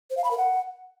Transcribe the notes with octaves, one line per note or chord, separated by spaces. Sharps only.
C5
F5
B5
A#4
F#5